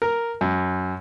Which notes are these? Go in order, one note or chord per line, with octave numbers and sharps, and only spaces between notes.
A#4
F#2